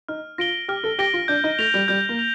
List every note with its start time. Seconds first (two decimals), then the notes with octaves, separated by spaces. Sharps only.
0.08 D#4 F6
0.38 F4 A#6 D7 G7
0.68 G4 F6
0.84 A4
0.99 G4 A#6 D7 G7
1.13 F4
1.28 D4 G6
1.44 D#4
1.59 A3 A#6 F7
1.74 G3
1.88 G3 G6
2.09 A#3
2.19 F7